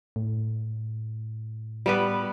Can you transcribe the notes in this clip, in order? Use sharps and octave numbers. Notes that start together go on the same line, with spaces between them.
A2
G3 B3 B4